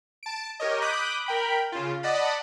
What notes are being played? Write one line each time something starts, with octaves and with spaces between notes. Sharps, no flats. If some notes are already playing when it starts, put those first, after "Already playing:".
A5 D7
G4 A#4 C#5 D#5
B5 D6 D#6 F#6 G6
A#4 G5 B5
C#3 F4
D5 D#5 F#5 A5 B5